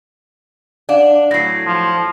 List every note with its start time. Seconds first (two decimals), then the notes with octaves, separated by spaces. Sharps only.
0.89 D4 D5 F5 F#5
1.31 A2 F#3 A#6 C7
1.66 F3